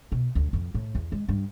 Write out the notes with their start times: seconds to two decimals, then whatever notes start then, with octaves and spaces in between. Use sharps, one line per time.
0.12 B2
0.35 D2
0.53 F2
0.74 A2
0.95 E2
1.12 G#3
1.28 G2